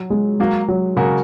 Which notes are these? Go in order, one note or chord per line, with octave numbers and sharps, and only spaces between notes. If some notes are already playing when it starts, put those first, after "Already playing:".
Already playing: F#3
G#3
F#3 A#3 F#4 A#4
F#3
C#3 A#3 F#4 A#4